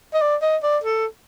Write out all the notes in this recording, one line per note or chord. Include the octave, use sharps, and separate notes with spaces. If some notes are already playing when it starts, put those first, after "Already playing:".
D#5
D5
D#5
D5
A4